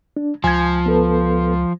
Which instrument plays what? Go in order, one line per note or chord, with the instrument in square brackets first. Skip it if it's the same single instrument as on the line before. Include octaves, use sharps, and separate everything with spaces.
[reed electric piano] D4
[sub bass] C#2 [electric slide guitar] F3 [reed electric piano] G#5 G#6
[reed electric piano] B3 A4 B4